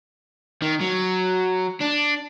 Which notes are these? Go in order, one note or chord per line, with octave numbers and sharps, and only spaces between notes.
D#3
F#3
D4